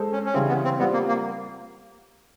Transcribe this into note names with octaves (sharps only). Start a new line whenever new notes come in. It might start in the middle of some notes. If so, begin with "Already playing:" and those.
Already playing: G#3 A4 C5
C#4
C#4
C#3 E3 G3 C4
B3
C4
G3 B3 C4 F4
A#3
A#3